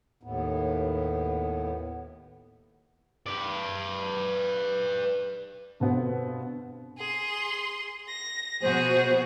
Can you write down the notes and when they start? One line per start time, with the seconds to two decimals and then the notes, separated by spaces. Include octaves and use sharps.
0.23 D#2 A2 B3
3.26 B4 D5
5.80 G2 B2 D3 B3 C4
6.98 G#4 C6
8.09 A#6
8.62 B2 F3 F#4 G#4 C5